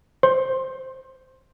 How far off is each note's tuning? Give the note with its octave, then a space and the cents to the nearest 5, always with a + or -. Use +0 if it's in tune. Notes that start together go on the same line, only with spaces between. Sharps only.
C5 +0 C6 +20